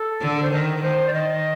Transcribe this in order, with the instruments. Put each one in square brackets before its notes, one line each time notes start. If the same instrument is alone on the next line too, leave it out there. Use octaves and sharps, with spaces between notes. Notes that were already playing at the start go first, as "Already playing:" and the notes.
Already playing: [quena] A4
[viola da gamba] D3
[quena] C5
[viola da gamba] D#3 [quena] A#4
[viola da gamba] D#3 [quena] C5
[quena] D5
[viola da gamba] D#3 [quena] D#5